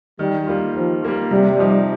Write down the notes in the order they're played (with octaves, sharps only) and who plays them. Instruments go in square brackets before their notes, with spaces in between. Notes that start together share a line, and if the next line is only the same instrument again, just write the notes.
[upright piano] D#3 [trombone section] G3
[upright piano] G3 A#3 F4
[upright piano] D#3 [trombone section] F3
[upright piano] G3 A#3 F4
[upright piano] C3 [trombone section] G3
[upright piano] F3 D#4 G4